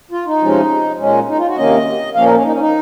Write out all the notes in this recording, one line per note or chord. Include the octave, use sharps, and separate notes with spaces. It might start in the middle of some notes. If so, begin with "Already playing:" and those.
F4
D#4
C3 F3 G#3 C#4
A#2 G#3 C#4
D#4
F4
F#4
C3 D#3 A#3 C#4 D#5
A#2 F3 A#3 C#4 F5
A#4
C#4
D#4
C#4
D#4